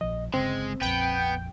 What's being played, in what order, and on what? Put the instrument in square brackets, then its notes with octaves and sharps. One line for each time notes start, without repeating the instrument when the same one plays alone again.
[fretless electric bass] A#1 F3 [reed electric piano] D#5
[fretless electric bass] G1 C#3 [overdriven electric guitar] G#3 [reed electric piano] C4
[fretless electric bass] A#1 F2 [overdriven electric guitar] B3 B4 [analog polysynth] G5